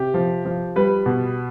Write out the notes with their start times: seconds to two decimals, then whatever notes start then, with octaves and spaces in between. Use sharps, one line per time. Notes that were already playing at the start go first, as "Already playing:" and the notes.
Already playing: C3 G4
0.14 F3
0.45 F3
0.76 G3 B4
1.06 B2